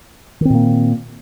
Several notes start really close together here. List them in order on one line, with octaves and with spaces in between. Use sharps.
D#3 C4 A#2 A#3